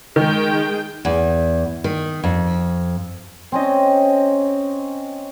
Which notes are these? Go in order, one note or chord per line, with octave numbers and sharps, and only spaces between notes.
D#3 G#3 G5
E2
D#3
F2
C4 C#4 D#5